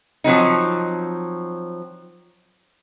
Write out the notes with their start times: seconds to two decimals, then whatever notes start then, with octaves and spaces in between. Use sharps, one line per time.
0.24 F3 F#3 C4 D#4